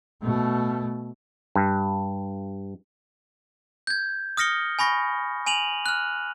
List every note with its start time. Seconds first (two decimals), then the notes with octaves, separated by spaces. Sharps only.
0.22 B2 A3
1.56 G2
3.87 G6 G#6
4.37 D#6 F6 A#6 C#7 G7
4.79 G#5 B5 C#6 A#6
5.47 G#5 D#7 F7 F#7
5.86 F6 F#6